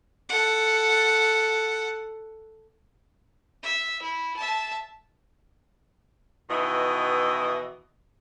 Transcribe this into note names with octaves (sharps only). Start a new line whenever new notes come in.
A4 F#5
E5
E4
E5 A5
B2 D#3 E3 E4 D#5